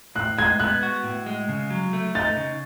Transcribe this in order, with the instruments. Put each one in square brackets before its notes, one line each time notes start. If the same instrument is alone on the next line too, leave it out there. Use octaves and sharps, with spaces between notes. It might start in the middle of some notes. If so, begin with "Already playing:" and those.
[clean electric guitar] A2 [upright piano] F#6
[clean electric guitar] G#3 [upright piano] G#6
[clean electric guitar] B3 [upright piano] F#6
[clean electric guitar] F#4
A2
G#3
C#3
F#3
A3
[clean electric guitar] D#4 [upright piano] A6
[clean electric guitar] C#3